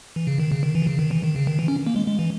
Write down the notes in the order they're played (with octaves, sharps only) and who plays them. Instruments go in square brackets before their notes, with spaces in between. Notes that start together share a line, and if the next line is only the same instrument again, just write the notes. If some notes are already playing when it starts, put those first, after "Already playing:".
[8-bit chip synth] E3
C#3
D#3
C#3
D#3
E3
D#3
C#3
D#3
E3
D#3
C#3
D#3
E3
C#4
A#3
G#3
G#3
E3